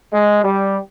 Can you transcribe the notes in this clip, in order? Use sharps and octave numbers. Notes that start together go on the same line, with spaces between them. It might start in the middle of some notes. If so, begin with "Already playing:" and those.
G#3
G3